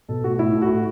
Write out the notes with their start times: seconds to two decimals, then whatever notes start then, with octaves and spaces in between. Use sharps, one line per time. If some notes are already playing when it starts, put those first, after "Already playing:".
0.09 B2 A4
0.24 A3 F#4
0.39 A2 E4
0.54 A3
0.62 F#4
0.70 A2